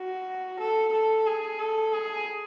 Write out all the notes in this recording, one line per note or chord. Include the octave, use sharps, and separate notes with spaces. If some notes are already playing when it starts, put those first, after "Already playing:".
Already playing: F#4
A4
A4
G#4
A4
G#4